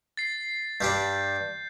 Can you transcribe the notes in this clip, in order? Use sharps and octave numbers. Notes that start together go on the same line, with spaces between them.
A6 C7
G2 G3 D4 G6